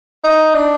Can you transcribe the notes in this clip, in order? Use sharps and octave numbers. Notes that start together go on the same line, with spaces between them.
D#4
D4